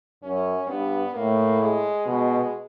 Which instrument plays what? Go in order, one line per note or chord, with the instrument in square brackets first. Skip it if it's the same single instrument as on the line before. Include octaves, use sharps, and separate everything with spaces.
[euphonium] F#2 [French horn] C#4
[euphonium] G2 [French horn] B3
[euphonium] A2 [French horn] A#3
[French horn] G#3
[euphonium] B2 [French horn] G#3